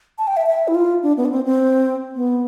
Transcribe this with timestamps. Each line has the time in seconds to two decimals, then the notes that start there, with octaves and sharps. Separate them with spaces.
0.18 A5
0.27 G5
0.37 E5
0.47 E5
0.68 E4
0.75 F4
1.03 D4
1.17 B3
1.25 D4
1.31 C4
1.45 C4
2.15 B3